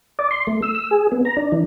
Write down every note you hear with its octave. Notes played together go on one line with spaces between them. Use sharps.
D5
C6
A3
E6
E6
G#4
B3
A#5
D4
E3